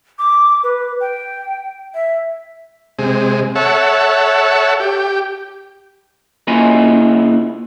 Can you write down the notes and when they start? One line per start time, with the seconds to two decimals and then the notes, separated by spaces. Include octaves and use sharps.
0.19 D6
0.64 B4
1.01 G5
1.94 E5
2.99 C3 G#3
3.55 A4 C#5 E5 F#5
4.80 G4
6.47 C#3 A#3 E4 F4 D#5 G#5